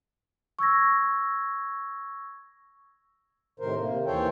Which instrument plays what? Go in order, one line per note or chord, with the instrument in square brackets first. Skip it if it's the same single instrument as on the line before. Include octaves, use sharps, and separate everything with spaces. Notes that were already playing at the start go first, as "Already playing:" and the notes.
[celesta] C#6 E6 G#6 A#6
[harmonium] A2 C3 D#3 A#4 C5
C3 A#3
D#2 E3 A4 C5 C#5 G5